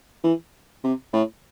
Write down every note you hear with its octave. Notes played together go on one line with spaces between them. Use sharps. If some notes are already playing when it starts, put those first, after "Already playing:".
E3
C3
A2